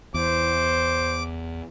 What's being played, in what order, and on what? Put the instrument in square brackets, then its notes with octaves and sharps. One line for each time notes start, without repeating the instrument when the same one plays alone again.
[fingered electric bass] E2 [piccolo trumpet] C5 [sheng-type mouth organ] D6